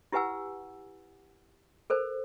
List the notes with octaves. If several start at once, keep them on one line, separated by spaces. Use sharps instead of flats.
E4 G4 B4 F#5 G#5 E6
A4 A#4 C5